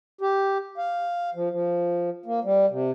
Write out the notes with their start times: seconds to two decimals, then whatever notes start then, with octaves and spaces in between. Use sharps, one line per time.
0.21 G4
0.78 F5
1.35 F3
1.50 F3
2.26 A#3
2.44 G3
2.70 C3